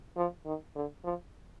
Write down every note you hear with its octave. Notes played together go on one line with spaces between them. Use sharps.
F3
D#3
D3
F3